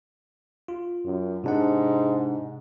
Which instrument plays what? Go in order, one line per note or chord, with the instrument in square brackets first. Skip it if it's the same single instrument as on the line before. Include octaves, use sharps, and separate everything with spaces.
[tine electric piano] F4
[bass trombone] F#2
[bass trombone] G#2 [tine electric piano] C3 D4 F#5